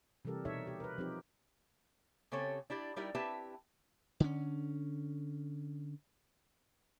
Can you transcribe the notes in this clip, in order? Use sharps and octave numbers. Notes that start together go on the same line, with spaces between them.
C3 E3 G3 G4 A4 A#4
B2 D#4 A4 C#5 E5
G4
A#4 B4
F3 C4 D#4 G4
C#3 C4 G4 A4 C#5
D4 E4 G4 D5
G3 D#4 E4 G4 A#4 D5
C4 E4 G4 B4 E5 A5
D3 C#4